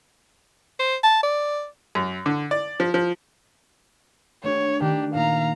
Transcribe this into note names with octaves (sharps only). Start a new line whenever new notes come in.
C5
A5
D5
F#2
D3
D5
F3
F3
A3 D4 G4 C#5
D#3 D4 G4
A#2 A#3 D#4 F5 A#5